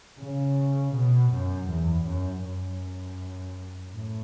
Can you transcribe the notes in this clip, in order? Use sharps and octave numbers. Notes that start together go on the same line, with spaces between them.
C#3
B2
F#2
E2
F#2
F#2
A2